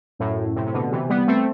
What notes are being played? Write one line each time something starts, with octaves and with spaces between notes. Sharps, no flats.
F#2 A2
A2 C3
C3
B2 D3
C3 E3
G3 B3
A3 C4